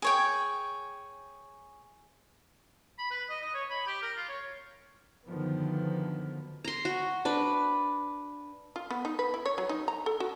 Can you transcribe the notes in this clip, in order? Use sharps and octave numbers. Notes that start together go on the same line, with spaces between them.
G#4 C#5 G5
B5
B4
D#5
D#5
C#5
B5
G4
A#4
F4
C#5
F#2 D3 D#3 F3 B3
A#5 C6
F#4
D4 B4
F4
B3
D#4
B4
E4
C#5
F#3
D#4
A#5
A4
F#4